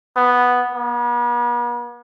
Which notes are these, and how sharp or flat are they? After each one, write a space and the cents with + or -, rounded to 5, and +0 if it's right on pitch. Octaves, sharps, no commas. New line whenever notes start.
B3 +0
B3 -45